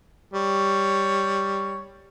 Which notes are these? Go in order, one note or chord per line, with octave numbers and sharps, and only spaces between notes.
G3 C#5